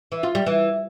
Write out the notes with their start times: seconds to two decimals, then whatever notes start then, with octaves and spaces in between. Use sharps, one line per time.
0.12 E3
0.23 F4
0.35 G3
0.46 E3